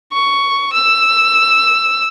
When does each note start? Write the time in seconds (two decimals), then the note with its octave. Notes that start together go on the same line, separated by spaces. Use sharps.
0.13 C#6
0.73 E6